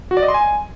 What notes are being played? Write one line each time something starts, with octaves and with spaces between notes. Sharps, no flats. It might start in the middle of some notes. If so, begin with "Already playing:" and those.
F#4
D5
D#5
C6
G#5